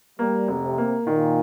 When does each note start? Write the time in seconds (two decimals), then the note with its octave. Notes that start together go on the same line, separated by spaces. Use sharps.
0.19 G3 A#3
0.48 F1
0.64 C3
0.78 A#3
1.07 A#2 D#3